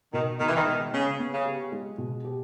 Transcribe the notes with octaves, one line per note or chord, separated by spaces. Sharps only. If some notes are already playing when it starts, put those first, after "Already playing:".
B2 D#3
B2 D#3
E3
D#3
D#3 G#3
C#3 B3
B3
C#3
G4
G#3
B2
G4